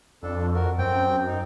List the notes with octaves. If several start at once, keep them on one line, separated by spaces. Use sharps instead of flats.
F2 D4 A4
F#4 A#4
F#2 C4 G5
D#4